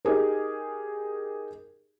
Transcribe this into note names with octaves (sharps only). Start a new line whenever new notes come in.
D#4 G4 G#4 A#4